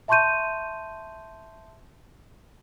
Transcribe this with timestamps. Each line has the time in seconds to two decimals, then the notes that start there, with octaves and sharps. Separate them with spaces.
0.08 E5 A5 C6 C#6 G6 D#7